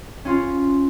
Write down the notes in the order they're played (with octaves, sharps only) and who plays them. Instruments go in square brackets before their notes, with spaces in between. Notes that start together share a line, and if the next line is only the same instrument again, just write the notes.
[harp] C#4 F4